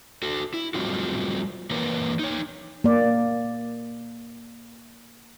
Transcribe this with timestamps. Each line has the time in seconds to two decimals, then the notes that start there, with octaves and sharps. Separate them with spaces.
0.23 F#4 A4
0.54 E4
0.74 F#3 G3 A3 C4 F4 F#4
1.71 E3 A#3 A#4 B4 C#5
2.19 D#4 C#5
2.84 A#3 D5